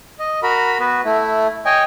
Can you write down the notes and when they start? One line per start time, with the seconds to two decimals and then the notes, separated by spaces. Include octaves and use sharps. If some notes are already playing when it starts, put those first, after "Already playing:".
0.19 D#5
0.43 F#4 A#4 B5
0.79 B3 F#4 B4
1.05 A3 E4
1.65 C#5 D#5 G5 G#5